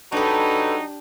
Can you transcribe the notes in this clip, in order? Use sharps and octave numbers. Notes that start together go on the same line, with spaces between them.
F#3 D4 D#4 G4 A4 B4